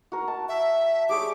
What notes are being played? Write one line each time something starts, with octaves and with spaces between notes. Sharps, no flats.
F#4 A#4
A5
E5
G3 G#4 C#5 D6